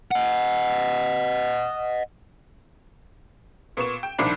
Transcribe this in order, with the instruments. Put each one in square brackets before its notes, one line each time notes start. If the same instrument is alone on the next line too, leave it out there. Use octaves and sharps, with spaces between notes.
[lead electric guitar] D#5 F#5
[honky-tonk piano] A#2 B3 C#6 E7
G5
C2 A#2 D#3 F3 D4 B5